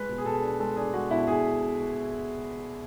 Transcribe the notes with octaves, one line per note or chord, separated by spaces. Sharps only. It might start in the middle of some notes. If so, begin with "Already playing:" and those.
Already playing: G#3 B4
B2
G#4
B2 A4
D4
G#3 A4
D4 G#4
G#3 F#4
B2 E4
B2 G#4